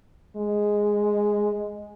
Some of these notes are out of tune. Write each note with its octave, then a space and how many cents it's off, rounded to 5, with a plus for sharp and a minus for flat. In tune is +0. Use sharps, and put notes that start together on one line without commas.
G#3 -5